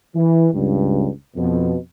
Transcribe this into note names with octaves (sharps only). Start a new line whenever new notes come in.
E3
C#2 G2
F2 B2